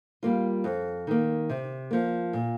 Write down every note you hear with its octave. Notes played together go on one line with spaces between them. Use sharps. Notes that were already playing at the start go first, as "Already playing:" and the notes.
G3 A#3 F4
F2
D#3 A#3
C3
F3 A#3
A#2